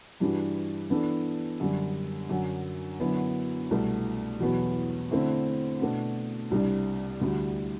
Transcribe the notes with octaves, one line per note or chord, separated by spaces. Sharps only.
G2 E3 G3 D4 F#4
E3 B3 D4 A4
F#2 D3 G3
F#2 D3 F#3
F#2 D3 F#3 B3 E4
C2 B2 A3
E2 B2 F#3 B3 F#4
D3 A3 C4 E4
B2 A3 D4 F#4
C2 C3 G3 D4
D2 D3 G3